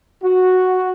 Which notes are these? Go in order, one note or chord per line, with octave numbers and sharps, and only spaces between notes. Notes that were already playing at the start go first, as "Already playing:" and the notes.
F#4